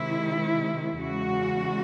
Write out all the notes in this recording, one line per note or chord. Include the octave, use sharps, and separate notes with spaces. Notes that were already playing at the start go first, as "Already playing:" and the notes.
Already playing: C3 D#3 G#3 E4
E2 C#3 G#3 F#4